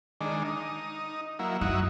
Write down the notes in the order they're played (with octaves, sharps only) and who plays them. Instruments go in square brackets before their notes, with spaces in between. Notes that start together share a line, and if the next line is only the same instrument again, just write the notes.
[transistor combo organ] D#3 G#3 D4
D#4
F#3 A#3 E4
[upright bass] F#2 [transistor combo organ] D#4 E4 F#4